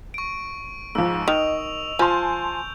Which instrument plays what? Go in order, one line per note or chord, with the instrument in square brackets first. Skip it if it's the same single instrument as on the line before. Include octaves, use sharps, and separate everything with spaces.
[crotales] C#6 D7
[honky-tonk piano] G#2 F3 [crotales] E6
[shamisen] D#3 [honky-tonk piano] D#5 [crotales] F7
[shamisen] F3 [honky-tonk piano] G#5 A5 C6 [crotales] G6